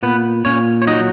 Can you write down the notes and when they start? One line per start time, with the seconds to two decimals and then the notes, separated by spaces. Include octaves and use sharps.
0.03 A#2 B3 B4
0.45 A#2 C#4 C#5
0.82 C#5
0.87 F#3 D#4 D#5